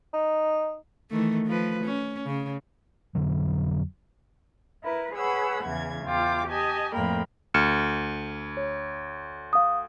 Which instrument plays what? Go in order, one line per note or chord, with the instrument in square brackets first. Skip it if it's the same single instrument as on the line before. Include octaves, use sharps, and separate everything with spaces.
[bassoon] D#4
[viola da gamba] D#3 E3 A3
F3 B4
C#4
C#3
[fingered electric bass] F2 D3 F#3
[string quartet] E4 A#4 B4
G#4 B4 C#5 F#5 B5 E6
E2 C#3 E3 G#6
E2 F4 G5 D6
G4 D#5 G#5 A5
F2 A2 A#3 A#4 G5 B5
[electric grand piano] D2 [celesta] F6 C#7 E7
[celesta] C#5
F5 D#6